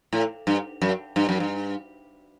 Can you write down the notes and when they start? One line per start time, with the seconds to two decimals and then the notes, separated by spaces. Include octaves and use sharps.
0.13 A2
0.47 G2
0.82 F#2
1.16 G2
1.29 F#2
1.40 G2